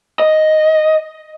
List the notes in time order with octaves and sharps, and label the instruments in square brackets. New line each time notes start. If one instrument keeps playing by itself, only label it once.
[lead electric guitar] D#5